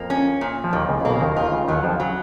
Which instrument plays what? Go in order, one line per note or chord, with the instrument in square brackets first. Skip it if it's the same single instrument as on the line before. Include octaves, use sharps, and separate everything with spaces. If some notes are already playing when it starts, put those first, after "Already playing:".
Already playing: [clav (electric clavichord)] F2 F3 [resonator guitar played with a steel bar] A#3
[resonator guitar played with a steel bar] C#4
A#2
[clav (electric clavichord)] F3
[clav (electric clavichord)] D#2 D#3 [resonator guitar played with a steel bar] A#2
[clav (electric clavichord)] C#2 C#3
[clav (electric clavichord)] B1 B2 [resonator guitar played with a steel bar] A#3
[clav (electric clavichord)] C#3
D#2 D#3
[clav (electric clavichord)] D#2 D#3 [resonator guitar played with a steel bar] F4
[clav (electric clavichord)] C#2 C#3
[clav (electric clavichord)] D#2 D#3 [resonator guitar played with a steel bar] F#3
[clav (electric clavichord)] F2 F3
[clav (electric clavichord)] C#3 [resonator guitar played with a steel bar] F#3